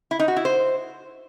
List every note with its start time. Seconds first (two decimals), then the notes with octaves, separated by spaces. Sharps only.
0.11 E4
0.19 D#4
0.28 F#4
0.36 E4
0.45 C5